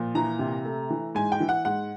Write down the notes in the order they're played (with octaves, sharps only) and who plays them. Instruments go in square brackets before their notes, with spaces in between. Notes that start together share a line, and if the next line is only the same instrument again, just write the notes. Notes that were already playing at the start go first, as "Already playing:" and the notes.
Already playing: [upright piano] A#2 F3
E3 A#5
C3
A3
E3
G#2 G#5
G5
E3
F#5
G#2 F#5